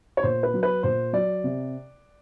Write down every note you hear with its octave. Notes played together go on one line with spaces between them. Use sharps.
C#5
A#2 C5
B4
F#3
B4
A#2 C5
F#3 D5
C3